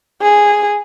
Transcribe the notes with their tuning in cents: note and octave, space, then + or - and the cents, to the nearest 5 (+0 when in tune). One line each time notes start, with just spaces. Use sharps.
G#4 -5